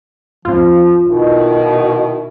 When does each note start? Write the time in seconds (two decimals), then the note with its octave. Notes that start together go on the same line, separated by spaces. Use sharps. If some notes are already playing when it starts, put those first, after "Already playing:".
0.45 D#2 G#2 F3 C4 F4
1.07 A#1 B2 D#3 E4